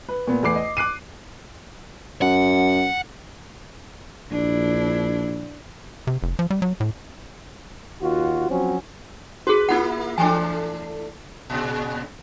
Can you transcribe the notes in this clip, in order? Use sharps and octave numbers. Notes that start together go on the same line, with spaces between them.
B4
A#2 B3
E2 A3 B4 D6 C7
D#5
D6 F#6 C7 D#7
F#2 F#5
A#1 D4 E4
C3
F1
F3
G3
F#3
A2
D#2 F4 F#4
F3 F#3 C4 C#4 F#4
F#4 G#4 B4
A#3 E4 F4 F#5
E3 A3 D4 G#5
A#2 C#3